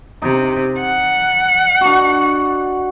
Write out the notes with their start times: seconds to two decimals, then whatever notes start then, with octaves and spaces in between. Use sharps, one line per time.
0.22 C3 D#4
0.78 F#5
1.81 D4 F#4